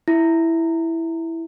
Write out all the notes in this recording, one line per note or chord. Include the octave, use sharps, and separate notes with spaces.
E4